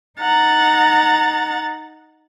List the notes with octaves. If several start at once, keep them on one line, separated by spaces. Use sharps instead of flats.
D#4 F#5 A#5 A6